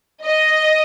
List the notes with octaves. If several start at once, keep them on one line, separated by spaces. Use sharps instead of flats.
D#5